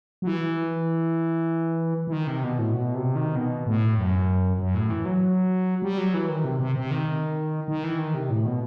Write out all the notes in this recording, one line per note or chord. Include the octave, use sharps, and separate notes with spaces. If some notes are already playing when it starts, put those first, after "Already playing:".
F#3
E3
E3
D#3
C3
B2
A2
B2
C3
D#3
B2
A2
F#2
F#2
A2
E3
F#3
G3
F#3
E3
D#3
C3
C3
C3
D#3
D#3
E3
D#3
C3
A2
B2